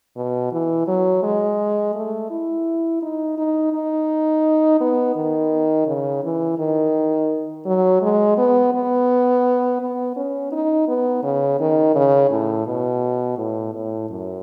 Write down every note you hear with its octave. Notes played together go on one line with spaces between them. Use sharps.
B2
E3
F#3
G#3
A3
E4
D#4
D#4
D#4
B3
D#3
C#3
E3
D#3
F#3
G#3
B3
B3
B3
C#4
D#4
B3
C#3
D#3
C#3
A2
B2
A2
A2
F#2